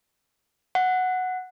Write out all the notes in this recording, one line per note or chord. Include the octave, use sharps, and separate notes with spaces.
F#5